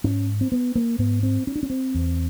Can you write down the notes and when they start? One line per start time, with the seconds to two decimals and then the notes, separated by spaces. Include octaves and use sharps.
0.04 G#2 C#4
0.41 C4
0.52 B3
0.75 A#3
0.99 G#2 B3
1.23 C4
1.47 C#4
1.56 D4
1.63 C#4
1.70 C4
1.94 E2